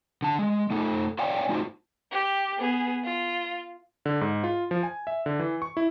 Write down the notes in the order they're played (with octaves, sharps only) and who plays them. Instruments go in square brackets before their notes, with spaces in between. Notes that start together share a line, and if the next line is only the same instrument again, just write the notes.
[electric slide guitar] D3 A5
G#3
A3 D#4 A4
C#5 D5 F5 G5 G#5
A3 D#4 F4 F#4 C5
[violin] G4
B3 G#4
F4
[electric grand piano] D3
G#2
F4
F3
G#5
E5
D3
E3
C#6
E4